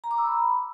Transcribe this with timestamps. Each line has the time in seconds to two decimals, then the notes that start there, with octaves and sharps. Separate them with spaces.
0.04 A#5
0.11 D6
0.18 E6
0.25 B5